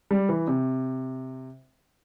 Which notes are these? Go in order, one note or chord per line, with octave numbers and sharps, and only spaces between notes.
G3
E3
C3